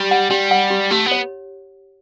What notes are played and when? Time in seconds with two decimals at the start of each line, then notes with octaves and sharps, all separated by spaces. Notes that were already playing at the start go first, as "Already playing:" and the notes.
Already playing: G3 G4
0.11 F#5
0.31 G3 G4
0.51 F#5
0.70 G4
0.91 A3 G4
1.06 B3
1.11 C#5